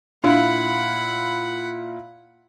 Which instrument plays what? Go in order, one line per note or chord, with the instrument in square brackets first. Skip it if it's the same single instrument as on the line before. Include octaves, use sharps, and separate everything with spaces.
[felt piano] A#2 E4 F5 [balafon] D4 [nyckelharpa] F#5 B5